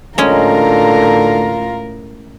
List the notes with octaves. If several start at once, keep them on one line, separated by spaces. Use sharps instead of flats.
A2 D3 G#3 C#4 F4 A#4 A#5